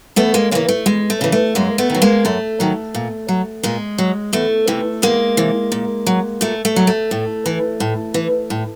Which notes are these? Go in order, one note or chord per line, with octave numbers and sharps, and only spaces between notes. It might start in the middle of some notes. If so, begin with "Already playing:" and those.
E2 A3 B3
G#3 A#3
C#3 E3 G#3 A#3
A3
E2 G#3
A3
C#3 E3
A3
F#2 G#3 A#3
A3 B3
D#3 F#3
G#3 A#3
F#2 A3
D#3 F#3
A#2
F#3
A#2 G#3
F#3
E2 A3
C3 E3
E2 G#3 A#3
C3 E3
A#2
F#3
A#2 A3
A3
F#3
A3
A2
E3
A2
E3
A2